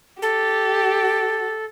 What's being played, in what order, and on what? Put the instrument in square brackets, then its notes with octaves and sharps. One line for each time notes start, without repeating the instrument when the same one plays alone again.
[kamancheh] G4 [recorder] A4